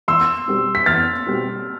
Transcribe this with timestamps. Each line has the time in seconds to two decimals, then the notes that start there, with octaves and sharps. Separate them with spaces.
0.08 E2 C6 E6
0.47 B2 G3 C4 G4
0.75 B6
0.86 E2 F6 A6
1.26 B2 G3 C4 G4